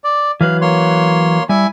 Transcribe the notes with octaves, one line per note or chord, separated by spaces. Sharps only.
D5
E3 F#3 B4 F5
A#3 C#5 C6
G3 E4 G#5